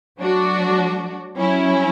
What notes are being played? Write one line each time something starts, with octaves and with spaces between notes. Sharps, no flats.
F#3 A3 D4 F#4
F#3 C#4 E4